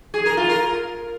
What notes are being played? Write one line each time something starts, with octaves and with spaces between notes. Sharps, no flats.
G#4
A#4
F4
A#4